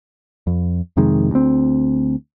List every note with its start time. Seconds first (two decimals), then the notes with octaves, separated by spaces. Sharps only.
0.47 F2
0.97 F2 C3 D#3 G#3
1.31 D2 C4